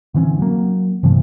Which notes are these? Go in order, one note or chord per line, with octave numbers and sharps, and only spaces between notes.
D3 E3 C4 C#4
F#3 A#3
G2 C3 E3 F3